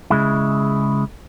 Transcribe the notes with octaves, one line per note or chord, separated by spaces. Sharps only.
C#3 G#3 E4